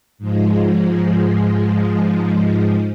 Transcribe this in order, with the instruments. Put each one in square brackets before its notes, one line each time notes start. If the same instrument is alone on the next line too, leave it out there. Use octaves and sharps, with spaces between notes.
[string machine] G#2 F3 G#3